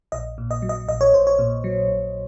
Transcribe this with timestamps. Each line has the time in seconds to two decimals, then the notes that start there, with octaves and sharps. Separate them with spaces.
0.12 A#1 D#5
0.38 A#2
0.51 D#5
0.62 F#3
0.69 D#5
0.88 A#1 D#5
1.01 C#5
1.13 A#1 C5
1.27 C#5
1.39 A#2
1.64 F#3
1.88 A#1